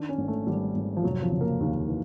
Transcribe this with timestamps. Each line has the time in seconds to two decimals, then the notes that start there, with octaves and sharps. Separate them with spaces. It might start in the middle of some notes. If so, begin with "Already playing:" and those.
Already playing: D#3 D4
0.09 C#4
0.18 G#1
0.28 A3
0.47 G#1 G3
0.75 G#1
0.97 F3
1.03 F1 F#3
1.22 F3
1.32 C#3
1.41 A#3
1.61 D#2
1.88 E3